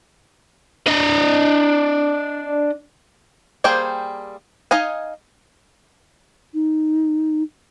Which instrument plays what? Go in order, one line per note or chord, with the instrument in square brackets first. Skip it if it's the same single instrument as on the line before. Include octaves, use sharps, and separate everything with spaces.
[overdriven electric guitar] D4 D#5
[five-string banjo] G3 A#3 G#4 C5 G5
D#4 D#5 F5 G#5
[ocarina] D#4